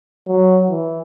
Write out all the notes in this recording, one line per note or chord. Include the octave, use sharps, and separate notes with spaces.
F#3
E3